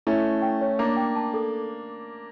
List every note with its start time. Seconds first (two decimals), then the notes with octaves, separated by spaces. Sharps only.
0.07 A3 C#4 E4
0.25 E4
0.42 G5
0.61 C#5
0.79 A#3 D4 A#5
0.97 G5
1.16 A5
1.34 A4